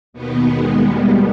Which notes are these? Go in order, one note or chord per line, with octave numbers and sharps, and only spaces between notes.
D#2 B2 D#3 B3
G#3
G3